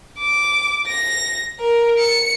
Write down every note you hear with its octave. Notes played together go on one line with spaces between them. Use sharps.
D6
A#6
A#4
C#7